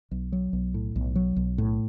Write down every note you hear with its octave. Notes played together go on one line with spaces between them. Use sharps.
B1
F#3
B1
A2
B1
F#3
B1
A2